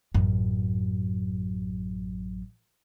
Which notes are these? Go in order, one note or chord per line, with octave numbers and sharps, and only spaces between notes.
A1 F#2